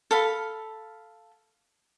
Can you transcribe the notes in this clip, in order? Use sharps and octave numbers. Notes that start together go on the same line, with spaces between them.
A4 F5 B5